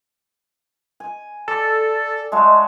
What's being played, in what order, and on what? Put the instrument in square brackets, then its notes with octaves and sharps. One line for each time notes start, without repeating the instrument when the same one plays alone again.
[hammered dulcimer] G#5
[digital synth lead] A4 [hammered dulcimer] D5
[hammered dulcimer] G#3 A3 F#4